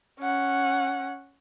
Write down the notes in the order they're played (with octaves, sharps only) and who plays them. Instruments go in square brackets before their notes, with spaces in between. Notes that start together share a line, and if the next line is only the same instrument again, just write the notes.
[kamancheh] C#4 F#5